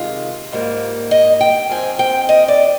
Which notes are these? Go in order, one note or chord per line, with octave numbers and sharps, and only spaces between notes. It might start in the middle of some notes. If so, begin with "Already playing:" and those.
Already playing: C3 D#3 G#3 F4
G#2 G3 A#3
D#5
G5
G#2 F3 C4 G#5
G5
D#5
D5